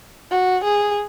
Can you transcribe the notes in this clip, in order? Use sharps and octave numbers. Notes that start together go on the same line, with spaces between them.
F#4
G#4